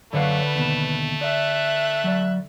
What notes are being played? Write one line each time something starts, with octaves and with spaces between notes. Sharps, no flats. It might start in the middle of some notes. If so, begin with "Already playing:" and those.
F#2 D3 A3 B4 C#5 F5 F#5
D#2 B2 E7
D5 E5 F#6
F#3 D5